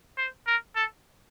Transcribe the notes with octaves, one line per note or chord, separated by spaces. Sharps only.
C5
A#4
A4